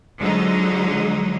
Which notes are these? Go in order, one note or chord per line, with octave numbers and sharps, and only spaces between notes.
D3 F3 F#3 G#3 D#4